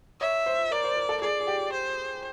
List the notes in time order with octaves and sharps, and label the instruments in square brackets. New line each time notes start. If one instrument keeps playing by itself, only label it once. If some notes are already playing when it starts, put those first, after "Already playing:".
[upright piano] C#5 [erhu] E5
[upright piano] C5
[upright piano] A#4 [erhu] D5
[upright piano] C5
A#4
A4
[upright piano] G#4 [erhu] D5
[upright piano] G#4
G4
[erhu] C5